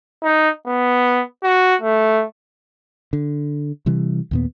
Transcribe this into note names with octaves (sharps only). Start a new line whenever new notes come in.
D#4
B3
F#4
A3
D3
C3 E3 G3
D#2 A#2 B3